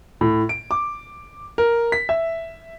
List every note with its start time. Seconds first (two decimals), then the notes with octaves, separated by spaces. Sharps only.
0.21 A2
0.49 D7
0.71 D6
1.58 A#4
1.92 B6
2.09 E5